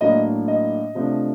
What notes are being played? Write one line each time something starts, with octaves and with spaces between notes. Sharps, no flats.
A2 F#3 A#3 D4 D#5
D#5
C3 F3 A3 D4